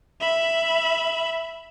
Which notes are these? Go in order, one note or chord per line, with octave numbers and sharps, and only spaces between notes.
E5 B5